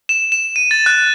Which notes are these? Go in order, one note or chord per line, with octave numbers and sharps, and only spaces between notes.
E7
E7
D#7
A6
F#6